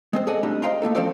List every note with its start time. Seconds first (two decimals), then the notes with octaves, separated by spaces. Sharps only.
0.13 G#3 C4 C5
0.27 G#4 A4 D5 D#5 F#5 G#5
0.43 G3 A3 C4 D4 D#4
0.62 C5 D#5 F5 G5 A#5 C6
0.82 A3 A#3 D#4 A4
0.95 F3 C4 C#4 A4 C5 D5